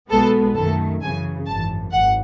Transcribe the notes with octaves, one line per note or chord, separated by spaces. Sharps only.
B1 B2 G#3 B3 A4
F#2 D#3 A3 A4
F#2 C#3 E3 G#5
G#1 F#2 E3 A5
G#1 F#5